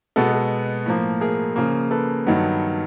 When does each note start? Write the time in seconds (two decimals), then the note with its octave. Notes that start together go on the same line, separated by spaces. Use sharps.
0.16 B2 G#3 B3 A4
0.34 A4
0.86 A2 F3 A#3
1.21 G#4 A#4
1.56 C#3 F3 A#3
1.91 A4 B4
2.26 G2 D#3 F#3 B3